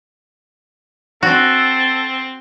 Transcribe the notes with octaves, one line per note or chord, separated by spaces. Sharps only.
C4 F#4 A4